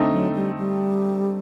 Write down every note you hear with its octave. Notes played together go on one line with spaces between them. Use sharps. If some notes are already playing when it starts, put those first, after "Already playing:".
Already playing: D3 A3 C4 D#4
F#3
G3
G3